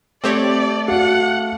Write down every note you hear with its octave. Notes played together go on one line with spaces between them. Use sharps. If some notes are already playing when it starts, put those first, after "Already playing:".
A3 C4 G4 C#5 D5
F#4 F5 F#5